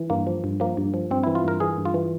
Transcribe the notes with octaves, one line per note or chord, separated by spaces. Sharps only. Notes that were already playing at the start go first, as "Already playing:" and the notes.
Already playing: E3
G2 A#3
F3
G2
F3 A#3
G2
F3
G2 C4
E3 E4
F4
G2 A#4
E3 G#4
G2
F4
E3